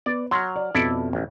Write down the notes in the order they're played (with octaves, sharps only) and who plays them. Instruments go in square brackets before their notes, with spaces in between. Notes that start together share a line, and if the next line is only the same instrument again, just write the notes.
[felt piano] B3 [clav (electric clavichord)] D5
[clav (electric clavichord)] F#3 [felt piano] C6 F6
[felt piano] D5
[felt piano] F2 B2 [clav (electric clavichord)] E4 A4 D5
[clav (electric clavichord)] A1